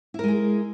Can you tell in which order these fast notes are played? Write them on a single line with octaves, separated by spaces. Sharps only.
E4 A#4 G#3 G#4